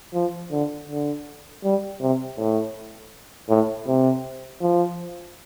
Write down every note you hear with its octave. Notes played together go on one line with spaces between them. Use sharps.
F3
D3
D3
G3
C3
A2
A2
C3
F3